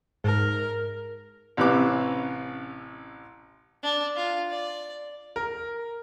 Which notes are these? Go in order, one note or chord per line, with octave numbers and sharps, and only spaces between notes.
G#2 A#4
A1 C3 E3 C#4 B4 D6
D4
F4
D5
A#4